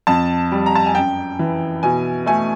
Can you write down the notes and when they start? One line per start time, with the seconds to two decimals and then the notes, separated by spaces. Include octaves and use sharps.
0.07 F2 A5
0.52 G3
0.66 A#5
0.75 A5
0.86 G#5
0.95 F#2 G5
1.39 E3
1.83 B2 G#5
2.26 A3 G#5